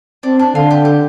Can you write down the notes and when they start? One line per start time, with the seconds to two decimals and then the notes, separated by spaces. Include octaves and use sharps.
0.23 C4 D4
0.39 D4
0.55 D3 F4
0.71 G4
0.85 G4